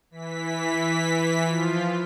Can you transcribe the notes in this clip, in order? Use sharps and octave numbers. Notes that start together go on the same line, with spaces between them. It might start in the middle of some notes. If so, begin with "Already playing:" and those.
E3 B6
F3 F4